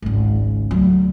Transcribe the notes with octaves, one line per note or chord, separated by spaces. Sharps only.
G#1 C#2
D2 F#3